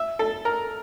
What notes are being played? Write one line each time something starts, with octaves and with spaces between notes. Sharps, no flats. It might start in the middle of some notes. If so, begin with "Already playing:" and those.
Already playing: E5
A4
A#4